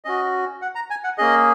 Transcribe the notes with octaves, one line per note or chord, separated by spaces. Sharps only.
C#4 F#4 D#5
F#5
A#5
G#5
F#5
A#3 C#4 G#4 D#5